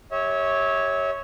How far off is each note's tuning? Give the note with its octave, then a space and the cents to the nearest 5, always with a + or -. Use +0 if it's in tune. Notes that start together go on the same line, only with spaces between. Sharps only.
G4 +10 C#5 +0 E5 -30